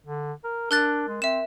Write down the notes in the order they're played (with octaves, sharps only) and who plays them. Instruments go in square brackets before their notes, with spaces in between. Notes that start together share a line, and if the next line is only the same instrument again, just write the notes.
[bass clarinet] D3
A#4
[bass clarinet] D4 [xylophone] A#4 F#6 A6
[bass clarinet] G#3
[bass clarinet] C4 [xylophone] E5 E7